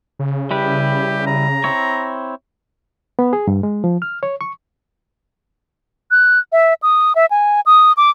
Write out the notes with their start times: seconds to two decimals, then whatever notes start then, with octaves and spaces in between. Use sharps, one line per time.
0.19 C#3
0.51 G3 E4 G4 B4
1.26 A#5
1.64 C4 E4 C#5
3.19 B3
3.33 G#4
3.47 G2
3.63 G#3
3.84 F3
4.02 F6
4.23 C#5
4.41 C#6
6.11 F#6
6.52 E5
6.83 D#6
7.15 E5
7.31 G#5
7.66 D#6
7.97 D6